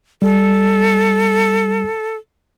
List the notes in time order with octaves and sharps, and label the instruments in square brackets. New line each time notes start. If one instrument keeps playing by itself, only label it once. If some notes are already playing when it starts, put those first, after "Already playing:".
[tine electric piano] G3 [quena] A4